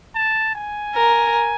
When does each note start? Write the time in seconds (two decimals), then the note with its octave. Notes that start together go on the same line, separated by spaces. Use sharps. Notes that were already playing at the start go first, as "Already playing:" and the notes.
0.15 A5
0.56 G#5
0.95 A#4